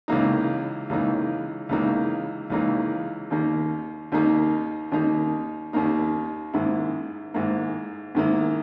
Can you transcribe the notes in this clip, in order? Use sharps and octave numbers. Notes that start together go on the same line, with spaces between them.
C#2 C#3 E3 A#3 D#4
C#2 C#3 E3 A#3 D#4
C#2 C#3 E3 A#3 D#4
C#2 C#3 E3 A#3 D#4
D#2 D#3 A#3 D#4
D#2 D#3 A#3 D#4
D#2 D#3 A#3 D#4
D#2 D#3 A#3 D#4
G#2 D#3 A#3 E4
G#2 D#3 A#3 E4
G#2 D#3 A#3 E4